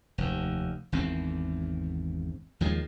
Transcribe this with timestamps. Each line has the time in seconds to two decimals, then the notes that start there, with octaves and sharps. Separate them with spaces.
0.18 F1 D#2
0.92 G#1 E2 G#2 C4
2.61 D#2 D#3 F3 G#3